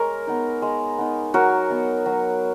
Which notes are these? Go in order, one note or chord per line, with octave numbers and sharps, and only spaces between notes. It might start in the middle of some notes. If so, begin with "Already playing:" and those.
Already playing: G#3 A#4 C#5
B3 D#4
G#3
B3 D#4
F#3 F#4 A#4
B3 D#4
F#3